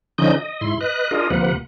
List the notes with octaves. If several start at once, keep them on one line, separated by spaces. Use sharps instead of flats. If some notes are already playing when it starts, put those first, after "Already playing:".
D3 F3 C#4 D#4 D#5 G6
D#5
G#2 E4 C6
B4 D#5 F#6
D4 F4 G#4 A#4 D#5
D2 C3 F3 A#3 B4 F#5